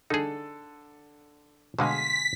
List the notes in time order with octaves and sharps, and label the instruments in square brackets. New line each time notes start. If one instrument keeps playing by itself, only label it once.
[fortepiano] D3 A4 [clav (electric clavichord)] D#4 G#4
[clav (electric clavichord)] B2 D3 G#3 [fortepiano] C5 F5 G#5 [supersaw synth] B6